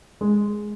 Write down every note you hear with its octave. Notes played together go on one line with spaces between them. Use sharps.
G#3